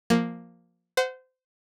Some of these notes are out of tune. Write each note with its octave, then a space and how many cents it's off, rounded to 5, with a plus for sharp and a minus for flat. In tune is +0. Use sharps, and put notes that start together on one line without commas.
F3 +0 A#3 +0
C5 -25 F#5 +0